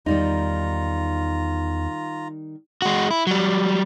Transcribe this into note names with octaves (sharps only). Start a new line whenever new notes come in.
E2 D#3 G3 D#4 F4 A#5
G#3 F#4
E4
F#3 G3